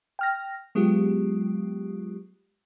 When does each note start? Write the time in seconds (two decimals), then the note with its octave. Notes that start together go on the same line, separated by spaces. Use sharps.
0.19 G5 F6 A#6
0.75 F#3 G#3 B3 F4 G4